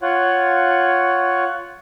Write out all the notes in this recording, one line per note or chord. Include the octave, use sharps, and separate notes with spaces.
F4 C#5 F#5